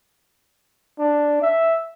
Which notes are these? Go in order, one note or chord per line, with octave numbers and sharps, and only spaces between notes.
D4
E5